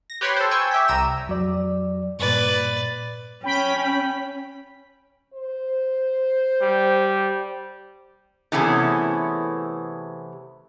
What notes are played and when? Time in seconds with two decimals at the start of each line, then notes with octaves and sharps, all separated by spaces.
0.10 A#6
0.21 G4 B4 C#5 G5 B5 C6
0.37 A4 C5
0.51 G5 G#5 C#6 E6 G6
0.71 G4 E5 G5 B6
0.88 C2 A#5 E6 D#7 E7
1.27 F2 F#3 D5
2.19 G2 A#2 B4 D5
3.44 C#4 G5 B5 B6
5.34 C5
6.62 G3
8.52 C3 E3 A3 B3 C#4 G#4